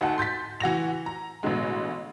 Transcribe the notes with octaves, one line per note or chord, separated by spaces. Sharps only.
D2 D#4 F#5 A5
C6 G6 A6 B6
E3 F#4 A#6 F7
A#5
A1 B2 D3 G#3